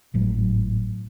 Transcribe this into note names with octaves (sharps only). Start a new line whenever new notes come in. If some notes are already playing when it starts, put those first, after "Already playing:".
G#1 A2 F#3